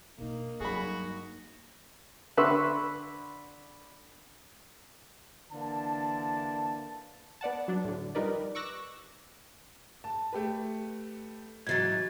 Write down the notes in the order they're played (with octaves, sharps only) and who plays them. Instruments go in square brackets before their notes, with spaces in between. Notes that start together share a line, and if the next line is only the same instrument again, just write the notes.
[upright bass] B2 D4 [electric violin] A#3 D#4
[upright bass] G2 F#3 [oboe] F#4 [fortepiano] G#4 B5
[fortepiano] D3 B4 E5 C6 C#6 E6
[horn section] D3 E3 A#3 A5
[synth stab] B3 D5 F#5 A5
F#3 D4
A2 D3
F3 G3 D#4 A#4 B4 D5
C#6 D6 E6 F#6 A#6
[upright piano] A5
A3 G4 B4
[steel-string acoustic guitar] G#2 E3 F#3 [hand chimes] G#6 A6